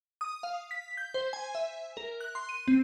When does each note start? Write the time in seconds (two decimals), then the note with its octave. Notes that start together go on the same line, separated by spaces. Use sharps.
0.21 D#6
0.43 F5
0.71 B6
0.97 G6
1.14 C5
1.33 G#5
1.55 E5
1.97 A#4
2.20 F#6
2.35 C6
2.49 D#7
2.68 C4